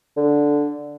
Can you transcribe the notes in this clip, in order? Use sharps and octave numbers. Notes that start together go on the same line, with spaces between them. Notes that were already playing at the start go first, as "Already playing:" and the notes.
D3